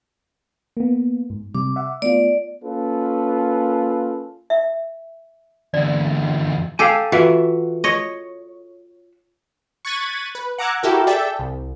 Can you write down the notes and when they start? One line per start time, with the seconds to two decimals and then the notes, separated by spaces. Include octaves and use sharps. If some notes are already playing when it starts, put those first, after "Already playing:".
0.77 A#3 B3
1.30 G#2
1.55 C3 G3 D6
1.76 E5 F#5
2.02 A3 B3 F4 D5
2.63 A#3 C#4 F4 A4 B4
4.50 E5
5.74 E2 D3 D5
6.79 G4 A4 F5 G#5
7.12 E3 F4 F#4 E5
7.84 C#5 D#5
9.85 C#6 F#6 G#6 A6 B6 D#7
10.35 B4
10.58 F#5 A#5 D6 E6 F#6 G#6
10.83 E4 F#4 G4 A4 A#4
11.07 G#4 A4 D5 E5 G5 A5
11.39 C2